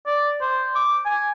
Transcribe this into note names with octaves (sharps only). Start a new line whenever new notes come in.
D5
C5
D6
G#5